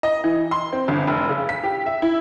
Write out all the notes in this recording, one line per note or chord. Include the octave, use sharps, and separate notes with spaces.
D#5
E3
C6
C4
G1
F1
C#3
B6
G4
E5
E4